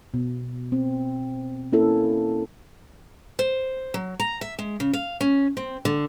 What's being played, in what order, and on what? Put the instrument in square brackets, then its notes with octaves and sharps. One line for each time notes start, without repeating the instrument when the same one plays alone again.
[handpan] B2
C4
A#3 C#4 E4 A4
[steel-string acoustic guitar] C5
F#3
A#5
E5
G#3
C#3
F5
C#4
C4
D3